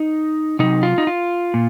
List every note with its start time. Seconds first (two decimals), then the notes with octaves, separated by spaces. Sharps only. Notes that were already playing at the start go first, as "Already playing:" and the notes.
Already playing: D#4
0.59 C3 F#3 D#4
0.83 F4
0.98 D#4
1.07 F4
1.54 A#2